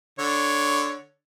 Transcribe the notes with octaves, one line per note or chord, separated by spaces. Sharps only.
D3 C#5